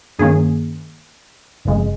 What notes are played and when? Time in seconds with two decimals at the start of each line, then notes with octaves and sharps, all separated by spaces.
0.19 G2 D#3 A#3 C#4 G#4
1.65 G1 F2 C#3 G#3